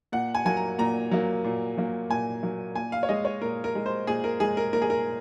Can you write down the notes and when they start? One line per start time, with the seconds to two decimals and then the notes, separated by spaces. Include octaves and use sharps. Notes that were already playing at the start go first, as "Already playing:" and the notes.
0.12 A#2 F#5
0.35 G#5
0.45 F#3 A#3 G#5
0.57 A#5
0.78 A#2 A#5
1.11 F#3 A#3
1.44 A#2
1.77 F#3 A#3
2.10 A#2 G#5
2.43 F#3 A#3
2.76 A#2 G#5
2.92 F5
3.03 C#5
3.09 G#3 D#5
3.25 C#5
3.42 A#2 A#4
3.64 A#4
3.75 G#3
3.86 C5
4.07 A#2 G#4
4.24 A#4
4.40 G#3 G#4
4.57 A#4
4.73 A#2 A#4
4.82 G#4
4.90 A#4